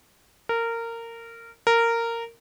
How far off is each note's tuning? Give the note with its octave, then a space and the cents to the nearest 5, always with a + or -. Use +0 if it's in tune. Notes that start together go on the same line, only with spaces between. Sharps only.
A#4 -20
A#4 -15